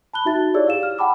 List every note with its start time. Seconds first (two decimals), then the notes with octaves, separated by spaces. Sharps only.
0.13 A5 B5 F#6 G7
0.25 D#4 F#4 E5 A5 A6
0.54 E4 G4 G#4 C#5 D5 E6
0.66 G4 F5 E7
0.83 F6
0.98 F#5 G5 A5 B5 D6 E6